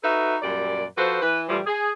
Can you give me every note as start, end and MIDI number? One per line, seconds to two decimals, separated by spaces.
0.03 0.35 63
0.03 0.35 66
0.03 0.35 69
0.03 0.35 71
0.03 0.35 76
0.42 0.83 42
0.42 0.83 46
0.42 0.83 55
0.42 0.83 74
0.97 1.19 53
0.97 1.19 66
0.97 1.19 69
0.97 1.19 71
0.97 1.19 72
1.22 1.43 52
1.22 1.43 71
1.49 1.59 45
1.49 1.59 52
1.49 1.59 53
1.49 1.59 55
1.66 1.90 68